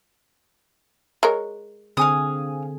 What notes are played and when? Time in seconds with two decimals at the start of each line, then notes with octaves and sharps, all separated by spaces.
1.23 G#3 A#4 C#5
1.97 D3 C4 G#4 F5 G#5 D#6